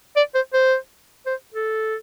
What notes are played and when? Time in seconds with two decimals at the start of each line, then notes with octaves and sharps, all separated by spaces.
0.16 D5
0.35 C5
0.53 C5
1.26 C5
1.54 A4